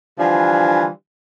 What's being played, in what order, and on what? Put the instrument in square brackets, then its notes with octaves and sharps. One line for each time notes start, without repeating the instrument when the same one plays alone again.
[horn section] D3 E3 F3 G3 F4 G#5